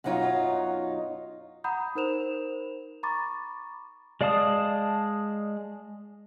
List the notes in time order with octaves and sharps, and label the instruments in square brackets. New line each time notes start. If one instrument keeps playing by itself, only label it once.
[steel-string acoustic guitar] F#2 B2 F#3 D#4 F4
[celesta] F#5 A#5 B5 D#6 G6
D#4 A#4 C5 E7 F7
A#5 B5 C#6 D6 A6
[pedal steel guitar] G#3 D5 F5 A5 D#6